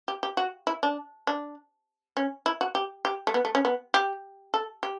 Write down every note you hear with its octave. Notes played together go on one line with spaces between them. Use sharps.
G4
G4
F#4
E4
D4
D4
C#4
E4
F#4
G4
G4
A3
B3
A3
C#4
B3
G4
A4
G4